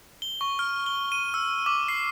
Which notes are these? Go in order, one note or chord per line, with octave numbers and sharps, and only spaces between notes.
G7
C#6
F6
G7
D#7
E6
D6
C7